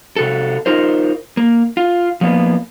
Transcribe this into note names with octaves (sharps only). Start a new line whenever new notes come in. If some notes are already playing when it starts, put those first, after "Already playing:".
C3 F#4 A4
D#4 F4 A#4 C5
A#3
F4
F3 A#3 B3